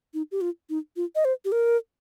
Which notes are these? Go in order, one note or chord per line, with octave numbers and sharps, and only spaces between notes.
D#4
G4
F4
D#4
F4
D#5
C5
G4
A#4